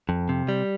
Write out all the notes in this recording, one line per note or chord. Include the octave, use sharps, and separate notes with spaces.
F2
C3
G3